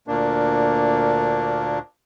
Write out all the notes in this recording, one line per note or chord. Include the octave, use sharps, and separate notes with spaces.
D2 A#2 A#3 D4